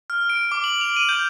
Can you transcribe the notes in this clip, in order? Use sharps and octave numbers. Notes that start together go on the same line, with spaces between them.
F6
D7
D6
F#7
F7
D#7
G6